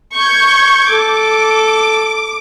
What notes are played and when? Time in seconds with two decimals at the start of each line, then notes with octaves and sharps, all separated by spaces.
0.16 C#6 G6 G#6
0.90 A4 D6